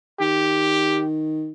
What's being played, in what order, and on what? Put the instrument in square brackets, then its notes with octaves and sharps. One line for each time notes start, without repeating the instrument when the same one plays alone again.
[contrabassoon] D#3 [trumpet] G4